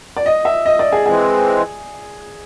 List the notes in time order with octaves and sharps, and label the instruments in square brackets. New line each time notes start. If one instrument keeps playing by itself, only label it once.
[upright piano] D5
D#5
E5
D#5
D5
G#4
[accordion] E3 G#3 C4 [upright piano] G#4